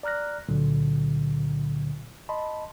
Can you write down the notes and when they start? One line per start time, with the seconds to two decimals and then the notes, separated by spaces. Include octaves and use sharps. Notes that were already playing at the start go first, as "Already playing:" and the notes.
0.03 D5 A#5 F6 F#6 A#6
0.49 C#2 A#2 D3 F#3
2.29 D#5 A5 B5 C6